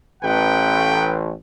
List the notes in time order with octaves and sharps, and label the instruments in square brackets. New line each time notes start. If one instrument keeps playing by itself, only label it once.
[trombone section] A1 [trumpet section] B4 F#5 G5